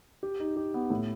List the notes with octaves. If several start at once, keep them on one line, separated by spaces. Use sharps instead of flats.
G4
D#4
G4
B3
A2